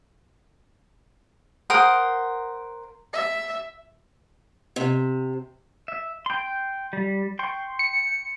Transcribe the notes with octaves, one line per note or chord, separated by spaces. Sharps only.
A#4 C5 F#5 D#6
E5
C3
E5
G5 C6
G3
G5 C6 C#6
C#7